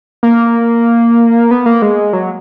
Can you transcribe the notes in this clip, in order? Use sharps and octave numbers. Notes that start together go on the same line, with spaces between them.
A#3
B3
A#3
G#3
F#3